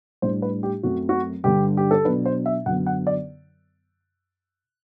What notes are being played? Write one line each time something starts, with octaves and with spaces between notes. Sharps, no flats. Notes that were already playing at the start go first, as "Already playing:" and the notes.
A2 G3 D4 C5
B4
G4
F#2 F#3 A3 C4 F#4
F#4
G2 D3 G3 G4
G4
A4
B2 F#3 B3 D4 B4
C5
E5
F#2 D3 F#3 B3 F#5
F#5
D5